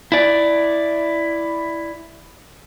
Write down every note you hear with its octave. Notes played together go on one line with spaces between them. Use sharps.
E4 D5